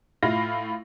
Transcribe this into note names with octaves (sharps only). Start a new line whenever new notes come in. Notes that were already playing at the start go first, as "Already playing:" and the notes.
A2 E4 F4 F5 A#6